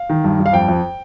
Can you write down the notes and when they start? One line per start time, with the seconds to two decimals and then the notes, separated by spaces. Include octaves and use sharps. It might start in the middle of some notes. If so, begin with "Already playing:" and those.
Already playing: F5
0.10 D#3
0.24 G2
0.39 G2
0.46 F5
0.53 F2 G5
0.68 F2